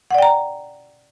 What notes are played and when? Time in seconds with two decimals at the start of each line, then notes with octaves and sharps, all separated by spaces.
0.11 F#5
0.15 D5
0.18 G5
0.22 A#5